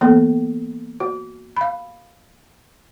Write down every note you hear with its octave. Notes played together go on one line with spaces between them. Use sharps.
E3 A#3 B3 A4 G5
F#4
F5 B5